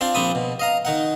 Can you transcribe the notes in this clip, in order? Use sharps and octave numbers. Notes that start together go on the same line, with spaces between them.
C4 D4 F4 C5 D5
A#1 F3 C4 D4 B5 D#6
B2
D#5 F5 A#5
D#3 D#4 F#5